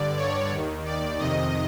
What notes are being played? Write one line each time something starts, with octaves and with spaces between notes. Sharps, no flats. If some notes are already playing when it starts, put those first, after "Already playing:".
Already playing: G2 D3 D5
C#5
D#2 D#3
D5
F2 C3 D#3 D#5